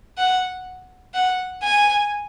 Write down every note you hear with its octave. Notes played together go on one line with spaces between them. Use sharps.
F#5
F#5
G#5